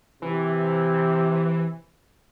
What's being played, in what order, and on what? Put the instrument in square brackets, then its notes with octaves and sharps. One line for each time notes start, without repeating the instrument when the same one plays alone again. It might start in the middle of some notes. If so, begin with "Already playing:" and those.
[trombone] C3 [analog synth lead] E3